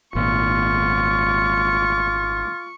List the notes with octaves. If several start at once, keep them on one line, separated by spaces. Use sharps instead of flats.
G#1 A#2 F4 C#6